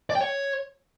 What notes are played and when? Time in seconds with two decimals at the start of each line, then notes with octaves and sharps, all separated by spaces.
0.10 D5
0.15 G5
0.21 C#5